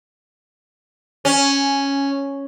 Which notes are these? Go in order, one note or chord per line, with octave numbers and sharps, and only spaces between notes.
C#4